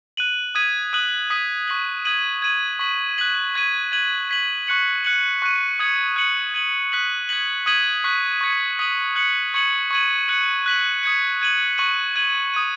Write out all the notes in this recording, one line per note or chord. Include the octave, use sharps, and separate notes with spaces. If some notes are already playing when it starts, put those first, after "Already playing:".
F#6 D#7 F#7
D#6 G#6 B6 D#7
D#6 F#6 D#7 F#7
D#6 B6 D#7
C#6 B6 F#7
D#6 G#6 D#7 F#7
G#6 D#7 F#7
C#6 B6 F#7
F#6 B6 F#7
C#6 G#6 B6 D#7
G#6 D#7 F#7
G#6 B6 F#7
C#6 F#6 C#7 F#7
F#6 C#7 F#7
C#6 F#6 D#7
D#6 G#6 C#7 F#7
F#6 C#7 F#7
G#6 D#7 F#7
F#6 B6 F#7
G#6 B6 F#7
D#6 G#6 B6 D#7 F#7
C#6 F#6 B6
C#6 G#6 C#7
D#6 B6 D#7 F#7
F#6 C#7 F#7
C#6 G#6 C#7 F#7
C#6 G#6 D#7 F#7
F#6 C#7 F#7
F#6 B6 F#7
D#6 G#6 C#7
G#6 D#7 F#7
C#6 F#6 D#7 F#7
G#6 D#7 F#7
D#6 G#6 D#7